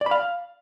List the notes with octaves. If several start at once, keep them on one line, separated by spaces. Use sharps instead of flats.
D5
B5
F5